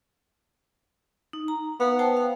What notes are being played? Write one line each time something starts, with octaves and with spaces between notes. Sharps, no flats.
D#4
A#5
B3 F5
C5 G5 A5
F5